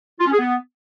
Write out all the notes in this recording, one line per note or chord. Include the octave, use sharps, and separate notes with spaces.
F4
C#4
G#4
B3